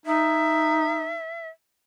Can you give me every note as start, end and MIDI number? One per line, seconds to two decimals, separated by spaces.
0.06 1.16 63
0.06 1.49 76